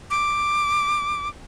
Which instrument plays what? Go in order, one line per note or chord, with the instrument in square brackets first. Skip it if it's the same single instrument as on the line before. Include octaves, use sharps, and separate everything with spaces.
[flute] D6